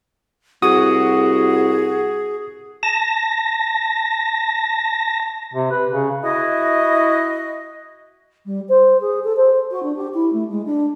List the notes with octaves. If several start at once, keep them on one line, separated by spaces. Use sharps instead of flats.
C2 F#4 G#4 D#6
A5 A#6
C3
B4
C#3
E4 F#4 D#5
G3
C5
G#4
A4
C5
F#4
D4
G4
E4
A3
G#3
D4